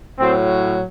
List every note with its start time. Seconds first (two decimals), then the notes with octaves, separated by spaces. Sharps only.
0.18 A2 F#3 C4